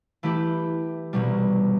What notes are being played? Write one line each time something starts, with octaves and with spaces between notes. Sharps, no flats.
E3 A3 E4 G4
C2 B2 G3